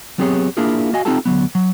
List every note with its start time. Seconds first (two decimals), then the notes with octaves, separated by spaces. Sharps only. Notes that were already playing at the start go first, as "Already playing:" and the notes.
0.18 F#3 B3 C4 G4 G#4 C#5
0.57 A#3 D4 E4 F4 G#4 A#4
0.93 F#4 D#5 F5 G#5
1.05 C4 D#4 F4 G4 A4 A5
1.25 D2 A#2 F#3 B3
1.55 F#3